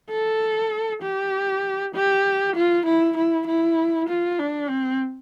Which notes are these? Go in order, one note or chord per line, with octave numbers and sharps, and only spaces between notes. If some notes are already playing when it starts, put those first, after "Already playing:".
A4
G4
G4
F4
E4
E4
E4
F4
D4
C4